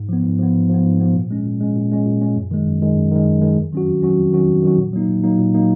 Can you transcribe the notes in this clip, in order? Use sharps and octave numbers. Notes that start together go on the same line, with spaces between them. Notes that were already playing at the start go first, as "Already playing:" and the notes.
Already playing: G#2
F3 B3
G#2
F3 B3
G#2
F3 B3
G#2
F3 B3
A#2
G#3 C#4
A#2
G#3 C#4
A#2
G#3 C#4
A#2
G#3 C#4
F#2
D#3 G#3
F#2
D#3 G#3
F#2
D#3 G#3
F#2
D#3 G#3
F2
D#3 F#3 C#4 F#4
F2
D#3 F#3 C#4 F#4
F2
D#3 F#3 C#4 F#4
F2
D#3 F#3 C#4 F#4
A#2
F#3 A#3 D#4
A#2
F#3 A#3 D#4
A#2
F#3 A#3 D#4